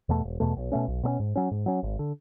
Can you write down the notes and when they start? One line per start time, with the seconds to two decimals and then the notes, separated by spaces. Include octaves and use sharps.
0.09 E2 B2 A3
0.24 E1
0.40 E2 B2 A3
0.56 B1
0.72 B2 A3 C#4
0.88 B1
1.03 B2 A3 C#4
1.20 G#2
1.36 F#3 C#4
1.51 G#2
1.66 F#3 C#4
1.83 G#1
1.99 D3